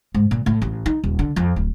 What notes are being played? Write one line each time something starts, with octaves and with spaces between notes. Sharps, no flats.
G#2
A#2
A2
A1
D#4
D#1
D3
F2
D1